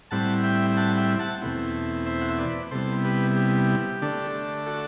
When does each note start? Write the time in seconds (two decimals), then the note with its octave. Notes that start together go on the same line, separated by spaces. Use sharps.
0.11 A2 G3 C4 E4 F#5 A5
0.43 E5 G5
0.77 F#5 A5
0.97 E5 G5
1.19 F#5 A5
1.41 E2 B2 A3 C4 E4
2.06 C5 E5
2.21 F#5
2.30 E5
2.38 B4 D5
2.71 C3 G3 B3 E4 A4 C5
3.05 G4 B4
3.36 G4
4.02 D3 A3 D4
4.66 F#4 A4